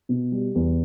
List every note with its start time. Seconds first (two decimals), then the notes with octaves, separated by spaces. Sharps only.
0.09 B2
0.32 G3
0.55 E2